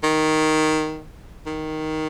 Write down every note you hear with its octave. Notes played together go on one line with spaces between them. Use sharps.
D#3
D#3